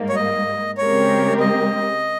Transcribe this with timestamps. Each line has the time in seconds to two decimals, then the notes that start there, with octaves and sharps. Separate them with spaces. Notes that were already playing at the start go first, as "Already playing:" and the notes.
Already playing: G#2 G3 A#3
0.09 C#5
0.15 D#5
0.77 C#3 G#3 C4 G4 A#4 C#5
1.40 D#5